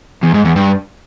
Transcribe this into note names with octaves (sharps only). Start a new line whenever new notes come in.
E2
G#2
E2
G2